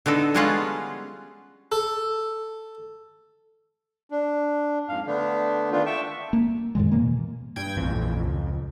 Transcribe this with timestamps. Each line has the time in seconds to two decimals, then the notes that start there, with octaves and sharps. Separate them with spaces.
0.06 D3 B3 D#4 A4
0.35 G3 G#3 B3 C#4 F4 F#5
1.72 A4
4.10 D4
4.88 F2 G#2 F5
5.07 D3 A3 B3 D4
5.72 D#3 A3 B3 D4 F4
5.86 E5 G5 A5 C#6
6.33 A#3
6.75 F2 A2 D#3 G#3
6.92 B2 E3 A#3
7.56 G2 G5 G#6
7.77 A#1 F2 E3
8.27 C#2